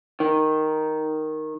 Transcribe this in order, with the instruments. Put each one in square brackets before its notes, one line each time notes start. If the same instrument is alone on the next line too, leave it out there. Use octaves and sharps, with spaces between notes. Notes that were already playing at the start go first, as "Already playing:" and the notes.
[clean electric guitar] D#3